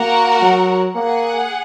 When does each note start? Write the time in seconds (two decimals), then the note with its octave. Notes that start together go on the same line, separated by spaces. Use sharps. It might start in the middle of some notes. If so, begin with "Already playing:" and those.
Already playing: A#3 F#4 A#4 F#5
0.42 F#3
0.95 A#3 G#4 F#5